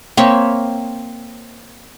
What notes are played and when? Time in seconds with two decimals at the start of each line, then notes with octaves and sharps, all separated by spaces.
0.17 A#3 C4 C#5 E5